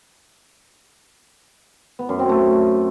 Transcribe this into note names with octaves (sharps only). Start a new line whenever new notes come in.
B3
F#2
C4
A3